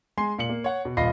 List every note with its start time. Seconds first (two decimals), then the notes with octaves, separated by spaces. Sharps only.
0.17 G#3 G#5 C6 C7
0.38 A#2 C#7 F#7
0.49 A#3
0.64 C#5 F#5
0.85 B2
0.97 D#1 F4 D#5 B5 A#6 C7